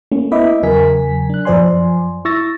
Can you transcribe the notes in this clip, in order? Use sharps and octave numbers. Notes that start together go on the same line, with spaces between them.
A3 A#3 C#4
B3 E4 D#5 E5 B5 D6
E2 C#3 F#3 A#4 G#5 B6
D4 F#6
F#2 F3 C5 D5 G#5 C6
E4 C#6 E6 A6 A#6